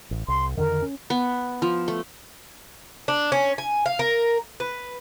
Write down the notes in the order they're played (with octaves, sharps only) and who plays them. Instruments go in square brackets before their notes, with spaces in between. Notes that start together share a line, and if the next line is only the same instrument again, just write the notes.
[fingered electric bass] A1
[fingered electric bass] C2 [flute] C6
[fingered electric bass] F2 D3 D#3 [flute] A#4
[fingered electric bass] C#4
[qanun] B3
F3
A3
[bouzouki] D4
C#4
G#5
F5
A#4
B4